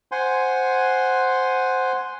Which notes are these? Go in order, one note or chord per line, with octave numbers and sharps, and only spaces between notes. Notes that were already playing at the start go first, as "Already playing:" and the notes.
C5 F#5 G#5 C6